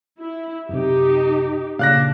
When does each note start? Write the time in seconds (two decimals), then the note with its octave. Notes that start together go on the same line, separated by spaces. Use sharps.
0.19 E4
0.69 F#2 C3 D#4 G4
1.79 A#2 C#3 D4 F5 F#6 A#6